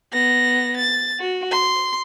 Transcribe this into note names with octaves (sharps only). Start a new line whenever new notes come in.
B3 A#6
A6
F#4
C6